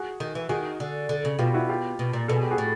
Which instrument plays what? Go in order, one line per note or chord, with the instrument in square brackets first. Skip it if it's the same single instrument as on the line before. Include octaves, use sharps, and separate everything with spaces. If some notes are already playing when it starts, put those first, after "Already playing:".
Already playing: [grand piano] F#4 G#4
[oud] D#3
E3
[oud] D#3 [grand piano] F#4 G#4
[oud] D3
D3
C#3
[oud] B2 [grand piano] F4 G4
[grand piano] E4 F#4
F4 G4
[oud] B2
A#2
[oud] B2 [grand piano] A4
[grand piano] G#4
G4
F#4 G#4
[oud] A2